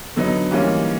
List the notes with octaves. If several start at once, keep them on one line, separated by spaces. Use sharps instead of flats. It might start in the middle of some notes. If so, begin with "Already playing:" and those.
D3 F#3 B3 D#4
G#2 E3 G3 A#3 C#4